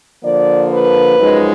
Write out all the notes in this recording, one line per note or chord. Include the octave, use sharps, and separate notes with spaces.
D3 F3 A#3 D5
B4
F#2 F3 G#3 D#4